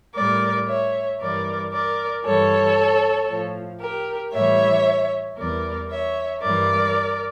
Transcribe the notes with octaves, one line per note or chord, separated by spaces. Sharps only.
A2 G3 A#4 D5
C#5 E5
G2 E3 G3 A#4 D5
A#4 D5
G2 E3 G3 A4 C#5
A2 F3
G4 A#4
A2 E3 G3 C#5 E5
E2 E3 G3 A#4 D5
C#5 E5
G2 E3 G3 A#4 D5